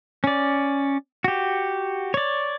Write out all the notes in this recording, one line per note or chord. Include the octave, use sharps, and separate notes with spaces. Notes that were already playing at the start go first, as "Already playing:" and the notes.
C#4 D5
F#4 G4
C#5 D5